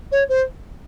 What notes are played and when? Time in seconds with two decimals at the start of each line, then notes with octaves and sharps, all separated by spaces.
0.11 C#5
0.28 C5